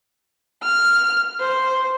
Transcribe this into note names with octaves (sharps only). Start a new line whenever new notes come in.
F6
C5